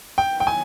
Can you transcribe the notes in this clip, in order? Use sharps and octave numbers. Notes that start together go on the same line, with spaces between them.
D#3 F#3 B3 E4 G5
G5
G#5